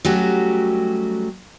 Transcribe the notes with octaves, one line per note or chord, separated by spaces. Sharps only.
F#3 G3 A3 C#4 F#4 G4